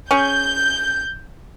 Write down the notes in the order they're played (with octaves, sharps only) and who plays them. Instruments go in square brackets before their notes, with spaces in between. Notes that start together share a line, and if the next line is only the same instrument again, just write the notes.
[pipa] C#4 G#4 [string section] G6